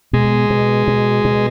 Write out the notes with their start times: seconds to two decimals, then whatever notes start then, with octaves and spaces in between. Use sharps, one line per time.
0.13 B2 G#3
0.50 B2
0.88 B2
1.25 B2